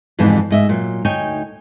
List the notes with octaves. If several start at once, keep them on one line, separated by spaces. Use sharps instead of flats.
F2 G#2 B2 D3 E3
G#2 D#5 E5
A#2 F#3
D2 D#4 C#5 G5 G#5